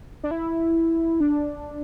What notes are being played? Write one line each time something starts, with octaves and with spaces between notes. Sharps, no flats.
D4
E4
D4